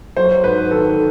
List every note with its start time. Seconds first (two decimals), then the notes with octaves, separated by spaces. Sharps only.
0.17 F#3 C5
0.44 G#2 B4
0.71 D#3 A4